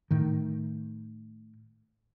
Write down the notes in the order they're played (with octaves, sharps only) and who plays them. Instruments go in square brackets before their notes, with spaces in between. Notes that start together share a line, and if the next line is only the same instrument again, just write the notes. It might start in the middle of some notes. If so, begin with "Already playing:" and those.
[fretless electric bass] A2 D#3